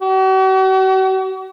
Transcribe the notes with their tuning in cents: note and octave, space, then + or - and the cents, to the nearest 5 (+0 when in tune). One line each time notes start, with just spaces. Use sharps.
F#4 +45